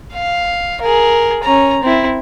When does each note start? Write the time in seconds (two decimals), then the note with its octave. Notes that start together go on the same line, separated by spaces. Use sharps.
0.14 F5
0.82 G#4 A#4
1.44 C#4 A#5
1.83 C4 E4